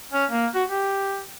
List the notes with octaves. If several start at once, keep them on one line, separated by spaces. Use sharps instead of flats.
C#4
A#3
F#4
G4